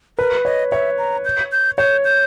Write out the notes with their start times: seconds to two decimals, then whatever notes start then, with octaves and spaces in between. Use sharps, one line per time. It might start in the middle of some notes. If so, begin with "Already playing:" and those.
0.18 A#4 B4
0.45 C#5 D#5
0.72 C#5 E5
0.98 A#5
1.25 G6
1.52 G6
1.78 C#5 G6
2.05 G6